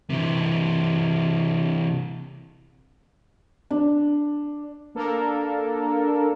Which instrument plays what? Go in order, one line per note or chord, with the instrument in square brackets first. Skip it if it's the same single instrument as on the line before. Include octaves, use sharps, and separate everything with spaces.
[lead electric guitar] C3 E3
[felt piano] D4
[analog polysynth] A#3 D4 A4 A#4